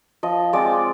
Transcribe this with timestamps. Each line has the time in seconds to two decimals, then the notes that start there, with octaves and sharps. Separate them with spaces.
0.23 F3 D#5
0.53 G#3 C4 F4 D5